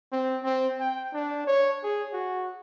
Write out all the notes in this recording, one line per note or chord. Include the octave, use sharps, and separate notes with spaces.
C4
C4
G5
D4
C#5
G#4
F#4